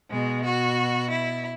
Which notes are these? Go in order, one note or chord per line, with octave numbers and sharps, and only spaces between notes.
B2 G#3
F#4
E4